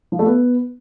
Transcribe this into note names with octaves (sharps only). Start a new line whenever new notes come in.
F3
A3
B3